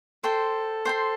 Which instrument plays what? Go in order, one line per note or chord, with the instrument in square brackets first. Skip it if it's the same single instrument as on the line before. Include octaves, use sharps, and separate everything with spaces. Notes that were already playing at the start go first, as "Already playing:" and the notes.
[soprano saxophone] A4 [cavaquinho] C5 G5 C6
[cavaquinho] C5 G5 C6